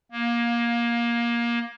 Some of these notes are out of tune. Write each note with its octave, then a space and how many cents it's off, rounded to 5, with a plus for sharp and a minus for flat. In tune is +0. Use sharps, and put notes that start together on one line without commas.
A#3 +20